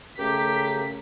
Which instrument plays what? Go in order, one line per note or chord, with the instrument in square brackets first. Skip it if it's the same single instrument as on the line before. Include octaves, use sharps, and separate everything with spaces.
[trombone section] C#3 A3 A#4 [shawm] G4 [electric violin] B6